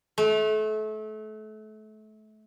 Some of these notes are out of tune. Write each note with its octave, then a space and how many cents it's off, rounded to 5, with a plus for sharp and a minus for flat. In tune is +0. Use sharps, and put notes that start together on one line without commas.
A3 -30